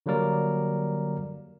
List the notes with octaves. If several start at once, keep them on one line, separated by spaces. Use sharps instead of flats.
D3 F#3 G3 A#3 A#4 D5